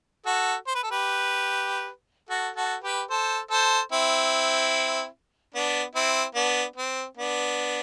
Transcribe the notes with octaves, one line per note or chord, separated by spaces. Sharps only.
F#4 A4
C5
B4
A4
G4 B4
F#4 A4
F#4 A4
G4 B4
A4 C5
A4 C5
C4 E4
B3 D4
C4 E4
B3 D4
C4
B3 D4